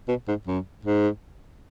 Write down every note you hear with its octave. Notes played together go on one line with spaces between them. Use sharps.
B2
G#2
F#2
G#2